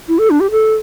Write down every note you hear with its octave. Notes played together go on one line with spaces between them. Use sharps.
E4
A4
D4
G4
A4